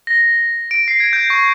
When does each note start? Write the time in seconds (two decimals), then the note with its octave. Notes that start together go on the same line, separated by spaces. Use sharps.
0.07 A#6
0.71 D7
0.88 C7
1.00 G#6
1.13 G6
1.30 C#6